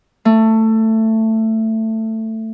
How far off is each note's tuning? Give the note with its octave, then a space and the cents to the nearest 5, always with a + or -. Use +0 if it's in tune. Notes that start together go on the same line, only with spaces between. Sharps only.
A3 +15